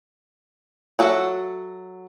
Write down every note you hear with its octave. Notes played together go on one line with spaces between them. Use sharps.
F#3 F#4 A4 E5 F#5